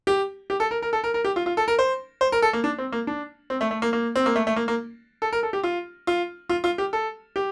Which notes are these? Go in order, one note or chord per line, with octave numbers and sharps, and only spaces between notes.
G4
G4
A4
A#4
A#4
A4
A#4
A#4
G4
F4
F4
A4
A#4
C5
C5
A#4
A4
A#3
D4
C4
A#3
D4
C4
A3
A3
A#3
A#3
C4
A#3
A3
A3
A#3
A#3
A4
A#4
A4
G4
F4
F4
F4
F4
G4
A4
G4